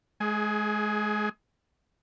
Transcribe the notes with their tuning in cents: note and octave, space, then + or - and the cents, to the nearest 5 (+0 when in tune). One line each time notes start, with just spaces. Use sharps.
G#3 +30 G#4 +0